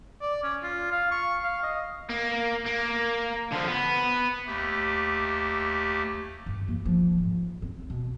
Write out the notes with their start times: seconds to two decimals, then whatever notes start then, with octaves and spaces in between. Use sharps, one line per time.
0.21 D5
0.43 C#4
0.63 F4
0.92 F5
1.11 C#6
1.44 F5
1.63 D#5
2.10 A#3
2.66 A#3
3.52 D3 F3
3.68 B3
4.47 D#2 A3 G4
6.46 G2
6.68 E3 A#3
6.85 F3
7.18 G#2
7.62 C4
7.90 B2